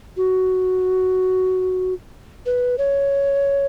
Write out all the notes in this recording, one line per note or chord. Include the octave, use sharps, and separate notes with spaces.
F#4
B4
C#5